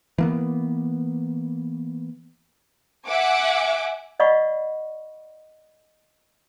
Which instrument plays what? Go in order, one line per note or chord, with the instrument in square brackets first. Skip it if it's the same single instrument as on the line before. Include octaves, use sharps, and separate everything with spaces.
[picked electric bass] E3 A#3 B3
[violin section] E5 F#5 G#5 D6
[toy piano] D5 D#5 F5 F#5 B5 C#6